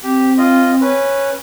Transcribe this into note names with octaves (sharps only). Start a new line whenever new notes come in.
C4 G4
F4 D#5
C#4 B4